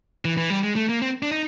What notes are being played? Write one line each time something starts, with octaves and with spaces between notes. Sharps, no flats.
E3
E3
G3
G#3
A3
A#3
C4
D4
D#4